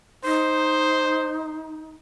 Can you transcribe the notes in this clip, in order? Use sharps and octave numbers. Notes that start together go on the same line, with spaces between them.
D#4 C5